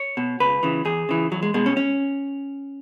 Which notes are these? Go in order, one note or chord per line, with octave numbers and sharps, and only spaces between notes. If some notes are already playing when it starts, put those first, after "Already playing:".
Already playing: C#5
B2
C#2 B4
C#3 E3
E2 G#4
C#3 E3
E2 F#3
G#3
B2 G#3
C#4
C#4